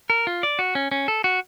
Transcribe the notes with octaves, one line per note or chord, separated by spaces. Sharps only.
A#4
F4
D5
F#4
C#4
C#4
A4
F#4